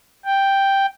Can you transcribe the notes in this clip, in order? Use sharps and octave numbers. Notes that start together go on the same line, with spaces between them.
G5